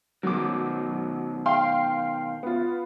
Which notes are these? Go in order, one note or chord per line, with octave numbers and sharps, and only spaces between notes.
B2 D#3 F#3 D6
F5 G5 C6
B3 F4